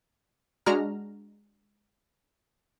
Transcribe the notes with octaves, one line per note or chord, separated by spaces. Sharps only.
G#3 D4 F#4 A#5 F6